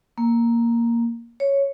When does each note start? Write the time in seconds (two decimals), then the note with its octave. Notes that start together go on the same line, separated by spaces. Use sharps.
0.18 A#3
1.40 C#5